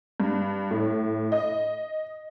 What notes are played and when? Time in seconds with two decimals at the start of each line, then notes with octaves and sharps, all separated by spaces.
0.20 G2
0.71 A2
1.32 D#5